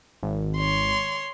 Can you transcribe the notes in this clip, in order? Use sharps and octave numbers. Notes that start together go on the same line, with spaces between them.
G#1
C#5 C6